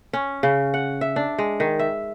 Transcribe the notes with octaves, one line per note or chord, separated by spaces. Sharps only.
C#4
C#3
F#5
E5
D4
G#3
D#3
E5